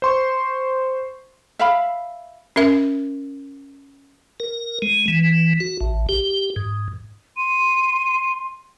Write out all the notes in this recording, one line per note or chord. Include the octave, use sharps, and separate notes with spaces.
C5 C6 C#6
E5 F5 B5
C#4 A#4 E5
A#4
G#3
E3
F#4
A1
G4
G#2
C6 D#7